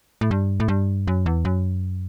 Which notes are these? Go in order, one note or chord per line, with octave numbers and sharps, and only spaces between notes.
A2
G2
A2
G2
F#2
E2
F#2